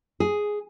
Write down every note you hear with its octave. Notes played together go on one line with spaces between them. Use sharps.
G#4